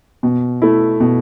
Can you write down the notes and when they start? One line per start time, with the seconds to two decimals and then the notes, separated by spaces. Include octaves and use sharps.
0.23 B2
0.62 A3 E4
1.00 B2